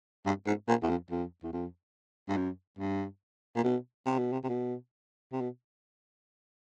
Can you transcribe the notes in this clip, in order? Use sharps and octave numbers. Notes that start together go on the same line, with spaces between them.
G2
G#2
A#2
E2
F2
F2
E2
F2
G2
F#2
G2
A#2
B2
C3
B2
C3
C3
B2
C3
B2